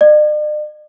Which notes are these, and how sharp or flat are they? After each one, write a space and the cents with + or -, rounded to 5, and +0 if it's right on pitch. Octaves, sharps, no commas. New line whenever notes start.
D5 +45